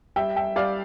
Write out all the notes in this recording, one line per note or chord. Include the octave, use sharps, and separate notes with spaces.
G3 E5 G5
E5 G5
G3 D5 F5